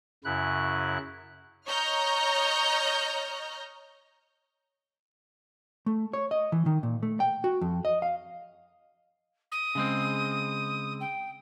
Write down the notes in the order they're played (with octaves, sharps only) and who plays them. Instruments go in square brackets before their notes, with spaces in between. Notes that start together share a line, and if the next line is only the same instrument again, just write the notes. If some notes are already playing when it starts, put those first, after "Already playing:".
[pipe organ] F#2 C#3 E4 F#6
[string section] C#5 D#5 A#5 F6 G6 A#6
[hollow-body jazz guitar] A3
C#5
D#5
E3
D#3
A#2
A3
G5
F#4
F2
D#5
F5
[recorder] D#6
[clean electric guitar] C#3 G#3 C4
[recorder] G5